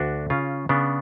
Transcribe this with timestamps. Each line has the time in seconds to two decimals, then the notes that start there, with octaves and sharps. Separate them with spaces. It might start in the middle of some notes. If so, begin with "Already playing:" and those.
Already playing: D2 D4 F#4
0.30 C#3 C#4 F4
0.69 C#3 B3 D4